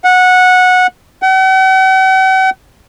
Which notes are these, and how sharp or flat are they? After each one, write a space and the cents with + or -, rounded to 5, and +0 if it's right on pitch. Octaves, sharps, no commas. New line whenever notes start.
F#5 -15
F#5 +45